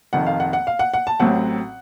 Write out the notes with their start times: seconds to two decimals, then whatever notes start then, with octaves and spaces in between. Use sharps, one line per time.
0.13 F1 F2 D#3 F#5
0.26 F5
0.40 F#5
0.53 F#5
0.67 F5
0.79 F#5
0.94 F#5
1.07 A5
1.20 A1 A2 F#3 C4 F#5